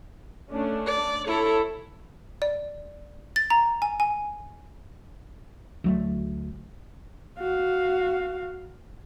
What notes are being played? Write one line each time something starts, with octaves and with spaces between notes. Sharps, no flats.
A3 C#4 D4
D5
E4 A4 C#5
D5
A6
A#5
G#5
G#5
D2 F#3 A3
F#4 F5